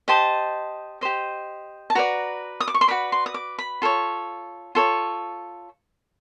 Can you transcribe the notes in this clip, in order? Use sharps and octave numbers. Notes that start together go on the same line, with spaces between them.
G4 C5 D#5 A5
G4 C5 D#5
A5
F#4 B4 D5 A#5
D#6
D6
C#6
C6
F#4 B4 D5 B5
C6
D#6
D6
B5
F4 A4 C#5
F4 A4 C#5